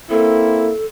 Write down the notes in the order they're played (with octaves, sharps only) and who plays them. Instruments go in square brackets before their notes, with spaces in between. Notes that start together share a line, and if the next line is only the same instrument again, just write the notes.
[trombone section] A#3 C4 E4 [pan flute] A4